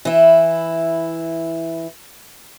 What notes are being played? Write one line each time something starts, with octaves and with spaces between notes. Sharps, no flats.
E3 E4